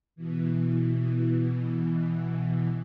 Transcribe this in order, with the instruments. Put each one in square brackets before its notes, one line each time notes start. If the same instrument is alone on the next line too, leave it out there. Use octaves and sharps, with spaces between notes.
[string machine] B2 E3